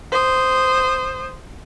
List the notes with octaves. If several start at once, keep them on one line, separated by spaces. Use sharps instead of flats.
C5 D#6